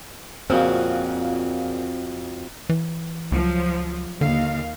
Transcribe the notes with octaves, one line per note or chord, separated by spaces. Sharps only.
F2 A#2 C#3 C4 F#4
E3
C#2 F3 F#3
D#2 D3 F5